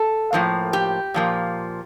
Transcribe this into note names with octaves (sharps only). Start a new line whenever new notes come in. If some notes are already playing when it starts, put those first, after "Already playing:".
Already playing: A4
A2 F3 A#3
G4
A#2 F3 A#3